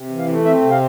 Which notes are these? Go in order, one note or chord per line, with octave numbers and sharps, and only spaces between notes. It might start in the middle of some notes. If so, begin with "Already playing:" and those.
Already playing: C3
E3
F5
A3
C4 E5
C3
F5